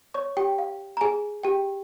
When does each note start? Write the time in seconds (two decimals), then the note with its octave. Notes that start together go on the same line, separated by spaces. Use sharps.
0.14 C#5 C#6
0.37 G4 G5
0.58 F5
0.97 A#5
1.01 G#4 G#5
1.43 G4 G5